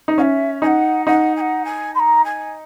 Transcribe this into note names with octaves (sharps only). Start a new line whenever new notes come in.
D#4
C#4 E5 F#5
D#4 F#5 G#5
D#4 F#5
G#5
F#5
G#5
C6
A#5
G#5